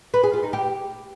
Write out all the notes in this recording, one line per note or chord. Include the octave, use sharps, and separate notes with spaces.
B4
G#4
F4
D#4
G4